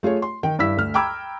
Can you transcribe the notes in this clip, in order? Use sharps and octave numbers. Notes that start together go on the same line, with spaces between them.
A3 F4 G#4 C#5
C6
D#3 G5
G2 E4 E6 B6
D2 F6
G5 A#5 B5 D6 E6 G#6